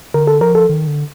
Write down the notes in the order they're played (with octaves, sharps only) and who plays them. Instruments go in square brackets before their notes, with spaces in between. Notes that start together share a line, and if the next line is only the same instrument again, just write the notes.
[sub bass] D3 [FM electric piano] A#4
[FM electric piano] A4
[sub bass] F3 [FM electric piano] A#4
[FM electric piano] A4
[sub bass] D#3
D3